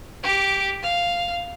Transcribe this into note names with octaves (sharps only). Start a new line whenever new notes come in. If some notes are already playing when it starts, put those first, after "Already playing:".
G4 D6
F5